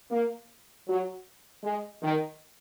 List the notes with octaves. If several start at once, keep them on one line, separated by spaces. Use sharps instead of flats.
A#3
F#3
G#3
D#3